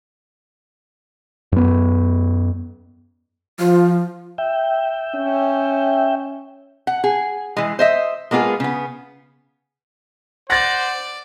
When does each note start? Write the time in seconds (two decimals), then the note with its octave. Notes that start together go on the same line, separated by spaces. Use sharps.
1.52 F#2 B3
3.59 F3 F4
4.38 E5 G5
5.15 C#4
6.87 F#5
7.04 G#4
7.57 E3 G#3
7.79 C5 D#5 E5
8.31 G#3 A#3 B3 F4 G#4
8.60 C#3 B3
10.50 C5 D5 F#5 A6 A#6